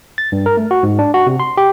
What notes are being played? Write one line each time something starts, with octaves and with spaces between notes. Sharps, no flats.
A6
G2
A#4
A3
F#4
G#2
D4
F#4
C3
C6
G4